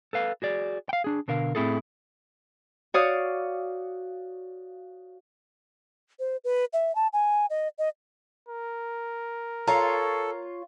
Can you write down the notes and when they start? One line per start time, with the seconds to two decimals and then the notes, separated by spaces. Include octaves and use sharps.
0.13 A4 B4 F5
0.42 F#4 G#4 D5
0.89 F5 G5
1.04 D4 G#4
1.28 B2 D3 A#4 F5
1.55 A2 C4 E4 G#4 A4
2.94 F#4 C#5 D5 F5 D#6
6.19 C5
6.44 B4
6.73 E5
6.95 A5
7.13 G#5
7.50 D#5
7.79 D#5
8.48 A#4
9.67 F4 A4 C#5 A#5